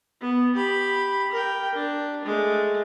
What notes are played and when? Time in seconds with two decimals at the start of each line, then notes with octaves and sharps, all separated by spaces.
0.21 B3
0.56 G4 B5
1.32 A#4 G5
1.75 D4
2.25 G#3 A3